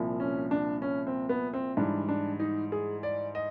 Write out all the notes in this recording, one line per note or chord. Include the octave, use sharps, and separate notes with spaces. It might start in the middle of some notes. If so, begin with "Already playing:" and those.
Already playing: C2 A#2 F3
C#4
D4
C#4
C4
B3
C4
G#2 E3 G3 D4
D4
D#4
G#4
D5
D#5